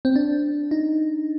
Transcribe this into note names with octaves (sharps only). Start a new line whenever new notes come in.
C4
D4
D#4